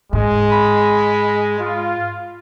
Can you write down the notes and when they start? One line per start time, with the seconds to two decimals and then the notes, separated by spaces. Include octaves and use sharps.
0.13 G#2 G#3
0.52 B5
1.60 F4